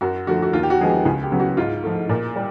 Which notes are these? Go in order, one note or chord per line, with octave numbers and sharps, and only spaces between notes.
F#2 F#4
D3 F3 A3 F#4
F#4
D#2 F4
G4
F#4
D3 F3 G#3 B3 G#4
G4
C#2 G#4
G4
C#3 F#3 B3
F#4
G#2 F4
F3 A3
A#2
G3